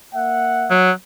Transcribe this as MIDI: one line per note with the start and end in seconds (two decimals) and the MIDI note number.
0.15 0.74 58
0.15 0.74 76
0.15 0.74 78
0.70 0.91 54